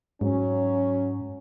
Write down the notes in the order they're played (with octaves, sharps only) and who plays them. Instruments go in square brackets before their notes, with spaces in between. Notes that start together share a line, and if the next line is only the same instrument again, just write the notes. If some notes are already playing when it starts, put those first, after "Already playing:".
[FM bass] G#2 [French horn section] F#3 C#4